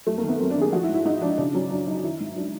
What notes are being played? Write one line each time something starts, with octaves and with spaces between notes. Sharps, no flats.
F#2 A3
A#3
D#3
B3
F#2 C4
D4
D#3
G#4
F3 F#4
E4
G#2
E4
G#2 D#4
F3 D4
C#3 D4
F#3 C#4
F#2 D4
F#2 D#4
D#3 E4
G#2
F#3 D4